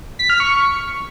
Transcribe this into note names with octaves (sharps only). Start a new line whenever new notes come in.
B6
F6
C#6